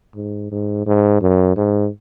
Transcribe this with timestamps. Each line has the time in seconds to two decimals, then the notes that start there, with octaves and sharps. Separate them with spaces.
0.16 G#2
0.52 G#2
0.87 G#2
1.22 F#2
1.57 G#2